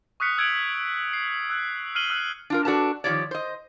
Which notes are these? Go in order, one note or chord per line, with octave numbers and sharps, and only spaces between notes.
C#6 D#6 F6 F#6 B6 C#7
E6 G#6 C#7 D7 F7 F#7
C7
E6 F#6
F6 C7 D#7 F#7 G7
E6 F#6
D4 F4 A#4
D4 F#4 A4 B4 A5
D#3 F3 A#3 G4 C#5 D5
C5 D#5